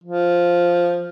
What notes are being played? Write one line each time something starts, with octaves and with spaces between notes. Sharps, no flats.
F3